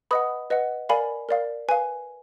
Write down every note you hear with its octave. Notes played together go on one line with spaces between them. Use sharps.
B4 D#5 F#5 B5 D#6
B4 D#5 F#5
A#4 D5 F5 G#5 B5
A#4 D5 F5
B4 F5 G#5